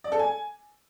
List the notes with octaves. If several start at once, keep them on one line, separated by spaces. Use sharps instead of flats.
D5
A4
G#5